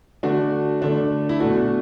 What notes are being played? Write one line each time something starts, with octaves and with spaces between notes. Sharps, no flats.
D3 A3 D4 F#4
D3 A3 D4
E4
B2 A3 D4 F#4